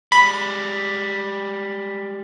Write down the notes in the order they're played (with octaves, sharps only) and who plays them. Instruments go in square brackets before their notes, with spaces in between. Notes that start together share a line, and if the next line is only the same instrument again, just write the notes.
[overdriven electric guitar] G3 G#3 [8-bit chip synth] B5